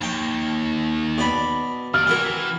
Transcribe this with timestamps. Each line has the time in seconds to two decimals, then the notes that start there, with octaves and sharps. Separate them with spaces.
0.01 D#2 G5 A#5
1.18 B2 D5 B5
1.94 D#3 D5 F6
2.07 E3 C4 F#4 A#4